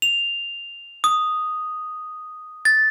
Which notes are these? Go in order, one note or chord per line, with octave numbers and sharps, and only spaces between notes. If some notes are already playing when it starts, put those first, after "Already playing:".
F7
D#6
A6